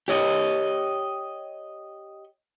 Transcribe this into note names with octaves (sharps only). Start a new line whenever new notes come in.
G4 C#5 D#5